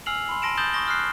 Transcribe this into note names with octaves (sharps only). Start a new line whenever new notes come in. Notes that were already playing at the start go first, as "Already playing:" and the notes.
G#5 E6 F6 C7 F7 F#7
B5 C6
A5 C6 A#6 D7 E7
D#6 G6 A6 E7 F#7 G7
C#6 D#6 A#6 G7
D#6 F6 F#6 C7